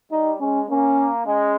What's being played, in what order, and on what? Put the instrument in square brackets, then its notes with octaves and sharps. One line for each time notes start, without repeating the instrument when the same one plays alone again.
[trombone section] G3 [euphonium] D#4
[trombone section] G#3 [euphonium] C#4
[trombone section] A#3 [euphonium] C#4
[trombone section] G#3 [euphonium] C#4